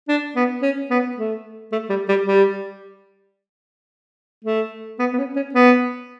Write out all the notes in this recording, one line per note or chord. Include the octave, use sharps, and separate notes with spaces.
D4
B3
C#4
B3
A3
A3
G3
G3
G3
A3
B3
B3
C#4
C#4
B3